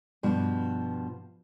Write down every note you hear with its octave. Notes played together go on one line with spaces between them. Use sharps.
G2 B2 F3